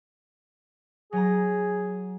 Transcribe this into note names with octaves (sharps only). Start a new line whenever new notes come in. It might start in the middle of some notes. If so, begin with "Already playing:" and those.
F#3 G#4 A#5